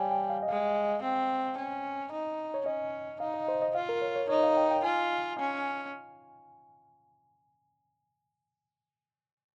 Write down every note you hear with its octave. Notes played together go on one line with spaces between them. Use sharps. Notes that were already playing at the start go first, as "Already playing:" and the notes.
Already playing: G3 C#5 F5 G5 G#5
G5
F5
D#5
G#3 F5
C4
C#4
D#4
C#5
C#4 D#5
D#4 F5
D#5
C5
D#5
F4 F5
A#4
C#5
C#5
D#4 C#5
F5
G5
G5
F4 G#5
C#4